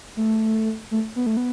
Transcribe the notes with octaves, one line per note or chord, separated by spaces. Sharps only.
A3
A3
B3
A3
B3